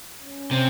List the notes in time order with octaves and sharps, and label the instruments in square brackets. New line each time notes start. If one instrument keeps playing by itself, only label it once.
[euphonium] C#4
[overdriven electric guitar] C3